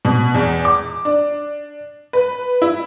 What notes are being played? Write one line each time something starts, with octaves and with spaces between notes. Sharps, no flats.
B2
E2
D6
D4
B4
E4